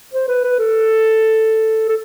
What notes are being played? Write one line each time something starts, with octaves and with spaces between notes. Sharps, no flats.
C5
B4
B4
A4
A4